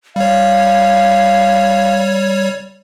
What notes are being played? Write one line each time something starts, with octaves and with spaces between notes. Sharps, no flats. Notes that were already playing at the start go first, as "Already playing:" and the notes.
G3 C#5 F5